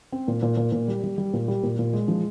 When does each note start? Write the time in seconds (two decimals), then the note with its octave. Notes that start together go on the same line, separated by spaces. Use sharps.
0.12 C4
0.28 A#2
0.43 A#2
0.57 A#2
0.72 A#2
0.88 G3
1.04 G3
1.18 G3
1.33 A#2
1.48 G3
1.63 A#2
1.79 A#2
1.93 G#3
2.08 F3